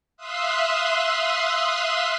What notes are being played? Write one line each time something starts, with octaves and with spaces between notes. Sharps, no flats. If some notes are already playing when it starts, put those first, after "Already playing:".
E5 F5 C6 D#6 E6 F#6